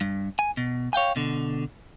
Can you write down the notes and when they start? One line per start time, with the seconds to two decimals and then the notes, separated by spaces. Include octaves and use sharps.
0.01 G2
0.39 G#5
0.57 B2
0.93 C#5 F5 G5 G#5
1.16 B2 D3